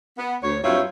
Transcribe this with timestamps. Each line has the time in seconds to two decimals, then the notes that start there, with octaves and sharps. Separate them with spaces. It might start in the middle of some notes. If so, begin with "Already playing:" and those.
0.18 B3
0.43 D2 C#5
0.63 G2 F#3 C4 E4 F4 C#5